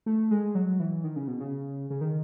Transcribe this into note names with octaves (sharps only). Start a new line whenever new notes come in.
A3
G#3
F#3
E3
D#3
C#3
B2
C#3
C#3
D#3